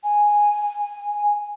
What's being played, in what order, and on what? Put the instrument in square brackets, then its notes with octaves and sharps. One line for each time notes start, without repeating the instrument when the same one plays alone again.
[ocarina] G#5